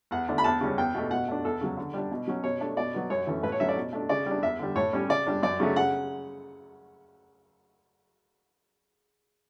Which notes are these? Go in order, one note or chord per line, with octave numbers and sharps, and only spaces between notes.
E2 F#5
D3 A3 D4
B5
E2 A5
C#3 G3 C#4
E2 G5
B2 A3
B2 F#5
A3 D4
E2 A4
C#3 F#3
D3
G3 D4
B2
F#3 C#4
B2 C#5
A3 D4
B2 D5
F#3 B3
F#2 C#5
E3 A3 C#4
A2 B4
C#5
F#3 A3 C#4 E5
D5
B2
A3 D4
C#3 D5
G3
D4
E2 E5
D3 G3
A2 C#5
G3 C#4
C#3 D5
G3 D4
F#2 D5
C#3 F#3 A3
C#3 F#5